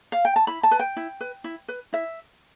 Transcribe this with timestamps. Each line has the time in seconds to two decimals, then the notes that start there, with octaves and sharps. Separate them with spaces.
0.12 F5
0.25 G5
0.36 A5
0.47 E4 B5
0.63 A5
0.71 B4
0.79 G5
0.97 E4
1.21 B4
1.44 E4
1.68 B4
1.93 E4 E5